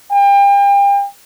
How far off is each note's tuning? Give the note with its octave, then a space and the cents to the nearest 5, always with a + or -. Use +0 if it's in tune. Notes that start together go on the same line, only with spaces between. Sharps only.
G5 +35